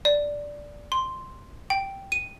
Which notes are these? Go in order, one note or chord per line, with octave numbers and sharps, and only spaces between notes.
D5
C6
G5
D#7